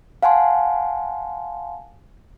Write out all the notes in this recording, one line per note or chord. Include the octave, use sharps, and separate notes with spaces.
F5 F#5 G#5 A5 C6